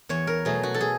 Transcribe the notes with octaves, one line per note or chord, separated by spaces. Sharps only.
E2 C#5
A#4
B2 F#3 A3 G#4
F#4
A4
G#4